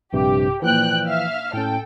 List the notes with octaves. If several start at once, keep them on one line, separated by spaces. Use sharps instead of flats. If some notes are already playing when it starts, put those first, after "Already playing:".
A#1 G2 C3 G4
A#2 E3 F3 G5 F#6
E5 F5 F6
A2 C#4 A4 G5